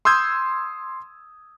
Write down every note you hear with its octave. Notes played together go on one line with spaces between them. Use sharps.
C6 D#6 E6 G6 G#6